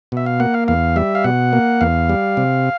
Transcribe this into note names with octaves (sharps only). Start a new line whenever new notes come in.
B2 E5
F5
A#3 F#5
F5
E2 F5
G3 E5
F5
B2 F#5
A#3
E2 F5
G3
C3